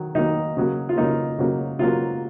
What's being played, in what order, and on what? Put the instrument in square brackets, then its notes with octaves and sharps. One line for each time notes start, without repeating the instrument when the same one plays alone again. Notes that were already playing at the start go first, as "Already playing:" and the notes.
Already playing: [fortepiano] D#3 F#3
D#3 F#3 A#3 D#4
C#3 F#3 A#3
F4
C#3 F#3 A#3 D#4
C#3 F#3 A#3
C#3 F#3 A#3 F4